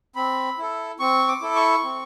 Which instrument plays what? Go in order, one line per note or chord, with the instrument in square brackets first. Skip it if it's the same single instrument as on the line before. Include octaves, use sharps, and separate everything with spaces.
[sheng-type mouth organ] C4 B5
E4 A4
C4 C#6
D6
E4 A4
C#6
C4